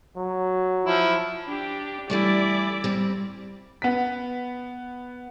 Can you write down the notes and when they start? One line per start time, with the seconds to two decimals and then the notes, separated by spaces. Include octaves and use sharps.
0.16 F#3
0.85 F3 E4
1.46 D4 G4
2.10 E3 G3 A3 E4 D5
2.84 G3 C4
3.82 B3 B6